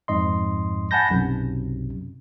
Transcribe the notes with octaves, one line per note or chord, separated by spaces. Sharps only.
F2 G#2 D#5 C6
F#5 G#5 A5 B5 G6 A#6
B1 F#2 C3